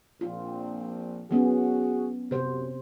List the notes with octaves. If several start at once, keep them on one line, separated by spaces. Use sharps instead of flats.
A#1 C4 F4
F#3 B3 C#4 F#4 G#4
F#2 C3 C5